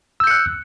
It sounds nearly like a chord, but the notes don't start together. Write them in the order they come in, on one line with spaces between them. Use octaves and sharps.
E6 G6 C#7 F#6